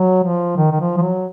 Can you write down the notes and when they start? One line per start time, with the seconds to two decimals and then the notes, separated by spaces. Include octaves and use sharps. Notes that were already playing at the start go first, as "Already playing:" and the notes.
Already playing: F#3
0.23 F3
0.57 D#3
0.72 D#3
0.81 F3
0.98 F3
1.02 F#3